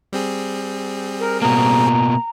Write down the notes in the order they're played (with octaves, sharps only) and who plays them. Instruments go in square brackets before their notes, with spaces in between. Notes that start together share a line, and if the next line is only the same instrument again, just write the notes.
[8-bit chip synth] G3 C4 G#4
[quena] A#4
[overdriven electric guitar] B2 A#3 [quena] A#5